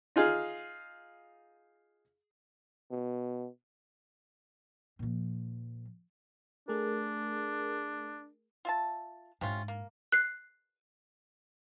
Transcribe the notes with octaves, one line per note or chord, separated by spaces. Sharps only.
D#4 F4 G#4 F5
B2
A#2 F3
A3 D4 G#4 A#4
F4 E5 A5
G#2 C3 C#4 D4 F4
A#3
F#6 C7